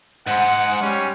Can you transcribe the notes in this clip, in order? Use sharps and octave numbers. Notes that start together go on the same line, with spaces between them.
G#2 G#3 F#5
G3 C#4